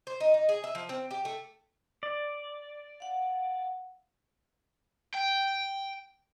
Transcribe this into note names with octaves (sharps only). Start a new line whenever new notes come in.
C5
D#4
D#4
G#4
E5
F3
C4
G4
A3
D5
F5 F#5
G5